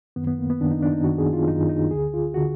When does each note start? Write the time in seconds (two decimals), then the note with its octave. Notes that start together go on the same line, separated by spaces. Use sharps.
0.16 F#2 D#3 B3
0.27 B3
0.39 A#3
0.50 B3
0.60 F#2 D#3 D4
0.71 D#4
0.82 D4
0.93 D#4
1.04 F#2 D#3 F#4
1.18 G#4
1.33 F4
1.48 F#2 D#3 D#4
1.69 D#4
1.91 D2 D3 G#4
2.14 F4
2.34 D3 F#4